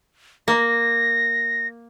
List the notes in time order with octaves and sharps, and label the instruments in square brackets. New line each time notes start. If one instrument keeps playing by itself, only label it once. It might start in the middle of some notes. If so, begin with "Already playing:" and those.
[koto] A#3 [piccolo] A#6